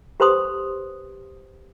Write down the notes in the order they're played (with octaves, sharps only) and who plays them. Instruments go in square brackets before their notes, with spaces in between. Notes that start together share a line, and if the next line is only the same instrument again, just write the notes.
[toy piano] G4 B4 C5 C6 D#6